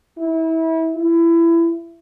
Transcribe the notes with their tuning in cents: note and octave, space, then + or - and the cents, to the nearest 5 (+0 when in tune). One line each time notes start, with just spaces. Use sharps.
E4 -30
E4 +20